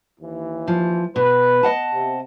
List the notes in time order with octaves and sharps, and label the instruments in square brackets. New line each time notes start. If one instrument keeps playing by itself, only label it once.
[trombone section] D#2 E3
[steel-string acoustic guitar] F3
[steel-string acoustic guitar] B2 [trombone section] B4
[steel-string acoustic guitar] D#5 F#5 A5
[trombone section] C3